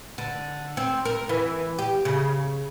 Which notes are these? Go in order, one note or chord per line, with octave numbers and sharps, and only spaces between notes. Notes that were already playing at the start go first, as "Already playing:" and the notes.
D3
C4
A#4
E3
G4
C#3